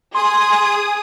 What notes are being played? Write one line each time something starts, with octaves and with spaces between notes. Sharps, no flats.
G#4 C6 D#6